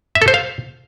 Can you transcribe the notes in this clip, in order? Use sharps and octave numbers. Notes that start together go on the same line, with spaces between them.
E5
A4
C5
F5